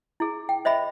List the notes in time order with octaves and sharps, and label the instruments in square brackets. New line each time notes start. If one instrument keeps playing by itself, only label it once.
[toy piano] E4 G#4
G5
C5 D#5 E5 B5